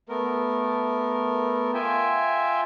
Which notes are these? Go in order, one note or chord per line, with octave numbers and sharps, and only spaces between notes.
A3 B3 A#4
F4 E5 G5 G#5